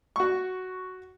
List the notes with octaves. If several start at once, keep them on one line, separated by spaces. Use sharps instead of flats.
F#4 C#6